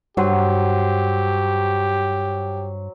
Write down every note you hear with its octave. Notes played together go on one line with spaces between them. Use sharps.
G2 F#3 G4 C5